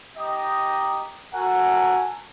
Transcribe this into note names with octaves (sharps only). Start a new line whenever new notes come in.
D#4 G4 D#5
F#4 A4 A#4 F#5 G#5